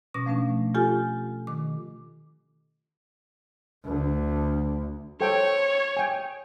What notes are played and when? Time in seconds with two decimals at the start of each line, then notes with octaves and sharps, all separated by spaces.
0.14 B2 C#4 D6 A#6
0.26 F3 A3 C#4 D4
0.75 F4 G4 A4 G#5
1.47 D#3 D6
3.85 D2
5.21 A4 C5 C#5 G5
5.97 G5 G#5